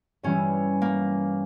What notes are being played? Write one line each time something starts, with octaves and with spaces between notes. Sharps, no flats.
G2 E3 G3 C#4
A#3